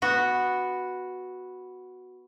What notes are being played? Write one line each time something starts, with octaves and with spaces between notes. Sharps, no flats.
B3 F#4